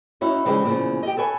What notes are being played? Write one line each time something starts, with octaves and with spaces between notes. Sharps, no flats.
C#4 D#4 E4 F#4 C#5
C#3 E3 F3 G3 G#3
E2 A#2 C#3 E3 F3
G4 A4 D#5
A4 B4 C#5 G#5